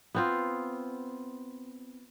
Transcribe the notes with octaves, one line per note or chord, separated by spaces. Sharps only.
B3 C4 F4